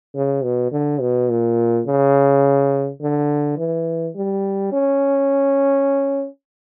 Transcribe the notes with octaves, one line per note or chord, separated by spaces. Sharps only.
C#3
B2
D3
B2
A#2
C#3
D3
E3
G3
C#4